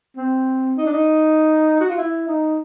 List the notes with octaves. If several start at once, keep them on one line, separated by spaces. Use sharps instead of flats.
C4
D#4
D4
D#4
F#4
F4
E4
D#4